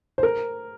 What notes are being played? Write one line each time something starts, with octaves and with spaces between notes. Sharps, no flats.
C5
A#4